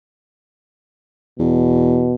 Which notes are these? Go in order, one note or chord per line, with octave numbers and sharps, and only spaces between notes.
E2 B2